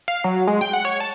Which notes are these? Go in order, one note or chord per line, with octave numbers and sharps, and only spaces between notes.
F5
F#3
G#3
G5
F#5
C#5
A5